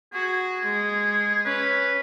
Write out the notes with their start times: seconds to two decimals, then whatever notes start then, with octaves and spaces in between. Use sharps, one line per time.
0.13 F#4 G#4
0.65 G#3
1.45 C#4 B4